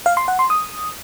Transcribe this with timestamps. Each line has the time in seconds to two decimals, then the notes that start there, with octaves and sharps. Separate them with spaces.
0.06 F5
0.17 C6
0.28 F#5
0.39 C6
0.50 D#6